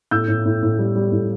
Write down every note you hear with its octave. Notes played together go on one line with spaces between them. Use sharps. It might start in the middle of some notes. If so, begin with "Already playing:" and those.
A2 E6 G6
A2
A2
A2
G3
G3
A2